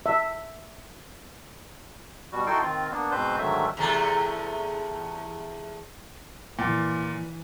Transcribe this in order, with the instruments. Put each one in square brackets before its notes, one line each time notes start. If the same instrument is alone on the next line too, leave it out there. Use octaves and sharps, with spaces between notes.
[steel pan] E5
[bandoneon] B2 G3 F#4
D#4 E4 F#4 A4 G5 C6
D#3 C4 F4
A#3 B3 D4
G#2 B2 C4 B4 C5 G6
G#2 D3 D#3 F#3 A3 E5
[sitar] E2 C3 A3
[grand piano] A#2 [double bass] E3